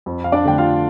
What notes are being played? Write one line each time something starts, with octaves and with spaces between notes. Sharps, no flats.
F2
F5
D4 D5
D3 A3 G5
F4 F5